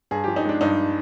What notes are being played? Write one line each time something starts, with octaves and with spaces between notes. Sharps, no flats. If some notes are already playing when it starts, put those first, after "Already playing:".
G2 G#4
F3 G4
D#4
G#3 D4
G2 D#4